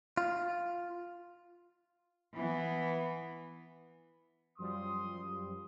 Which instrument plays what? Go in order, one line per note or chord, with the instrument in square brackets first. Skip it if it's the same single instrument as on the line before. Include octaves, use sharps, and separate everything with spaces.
[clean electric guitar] F4
[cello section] E3 B3
[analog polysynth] F#2 F3 G3 [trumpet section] C6 D#6